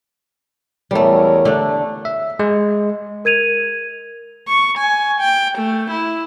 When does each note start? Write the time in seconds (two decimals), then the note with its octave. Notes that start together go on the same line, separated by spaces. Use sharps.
0.91 E2 G3 A3 A#4 C#5
1.45 D3 A3 D4
2.05 E5
2.39 G#3
3.25 A#4 G#6 D#7 F7
4.48 C#6
4.78 G#5
5.21 G5
5.58 A3
5.90 E4